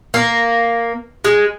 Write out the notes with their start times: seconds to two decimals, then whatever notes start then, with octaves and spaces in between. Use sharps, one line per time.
0.14 A#3
1.24 G#3